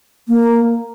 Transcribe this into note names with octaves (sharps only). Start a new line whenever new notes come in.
A#3